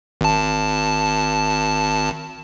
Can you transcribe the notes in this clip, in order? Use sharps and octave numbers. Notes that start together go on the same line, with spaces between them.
G#1 A5